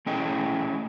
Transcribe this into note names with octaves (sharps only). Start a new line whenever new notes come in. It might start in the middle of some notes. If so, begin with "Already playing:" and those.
A3 C#4 E4 G#4 D#5 G5